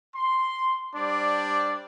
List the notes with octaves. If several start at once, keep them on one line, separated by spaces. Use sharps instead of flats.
C6
G3 D4 C5 D5 D6